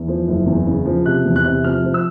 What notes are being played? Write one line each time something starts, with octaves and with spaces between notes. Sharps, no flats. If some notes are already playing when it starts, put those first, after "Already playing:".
Already playing: E2
F3
F#1
E2
C#3
F3
C3 F#6
E2
F#6
C3
F3 F6
F3
E6